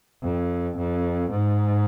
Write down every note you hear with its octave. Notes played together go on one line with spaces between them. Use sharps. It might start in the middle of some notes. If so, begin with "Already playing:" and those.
F2
F2
G#2